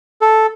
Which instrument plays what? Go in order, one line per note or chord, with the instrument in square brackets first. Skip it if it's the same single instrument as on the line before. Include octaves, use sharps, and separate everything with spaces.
[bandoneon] A4